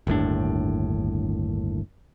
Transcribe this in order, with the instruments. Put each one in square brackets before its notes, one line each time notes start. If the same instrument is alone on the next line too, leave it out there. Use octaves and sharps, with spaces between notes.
[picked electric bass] G1 D#2 A2 D4